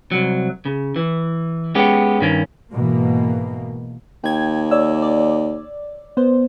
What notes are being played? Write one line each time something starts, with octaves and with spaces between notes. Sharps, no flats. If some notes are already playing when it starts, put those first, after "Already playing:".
C2 F#3
C#3
E3
G#3 B3 C#4 G4
G2 D#3 C#4
G#2 B2 E3 A#3
D#2 G5 G#6
C#5 D5 E6
D5
B3 C5